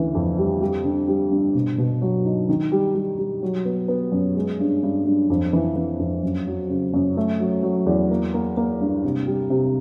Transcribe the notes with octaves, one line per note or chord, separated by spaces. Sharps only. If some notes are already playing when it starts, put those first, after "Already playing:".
Already playing: D2 C#3 E3
F2
G3
G3
D3
G3
G2
B2
B2
F#3
D#4
D#3
G3
G3
G3
F#3
B3
B3
F#2
G#3
G2
G2
G2
F2
E3
E3
F2
F#2
F#3
C#3
F#2
A3
F#3
F#3
E2
A#3
A#3
A#3
G2
C3
G3
C3